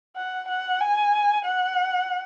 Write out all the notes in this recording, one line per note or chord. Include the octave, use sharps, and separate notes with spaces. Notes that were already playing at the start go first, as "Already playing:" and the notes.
F#5
F#5
G#5
F#5